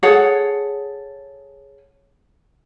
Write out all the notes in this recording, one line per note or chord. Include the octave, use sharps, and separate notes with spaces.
G#4 A4 C#5 F#5